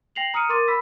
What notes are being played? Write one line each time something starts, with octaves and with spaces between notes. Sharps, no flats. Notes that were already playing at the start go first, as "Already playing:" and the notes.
G5 A#6 C7 F7 F#7
A#5 D#6 F6 C#7 D#7
A#4 C6 D6 A6 D#7
B5 E6 B6